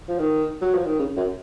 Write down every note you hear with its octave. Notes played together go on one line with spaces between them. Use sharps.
F3
D#3
F#3
F3
D#3
C#3
F#2